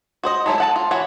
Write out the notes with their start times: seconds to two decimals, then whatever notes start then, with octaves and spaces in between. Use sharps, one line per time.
0.23 F#4 C5 D#5
0.46 F#3 G#3 A3 D#4 E4
0.58 A4 F#5 A5
0.76 F4
0.91 E3 F#4 C#5 F#5